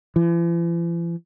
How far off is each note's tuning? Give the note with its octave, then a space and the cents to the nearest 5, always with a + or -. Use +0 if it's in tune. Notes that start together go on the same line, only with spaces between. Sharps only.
E3 +45